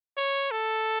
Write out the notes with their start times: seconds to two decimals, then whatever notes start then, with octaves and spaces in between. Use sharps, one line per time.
0.17 C#5
0.51 A4